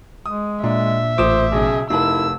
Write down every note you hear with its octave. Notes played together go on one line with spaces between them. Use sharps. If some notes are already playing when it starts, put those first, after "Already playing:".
G#3 D#6
A#2 D4 E5
A1 A#2 A3 C5 D6 D#6 E7
B1 C#3 G#4
F1 D#4 E4 A4 A#4 A5 E6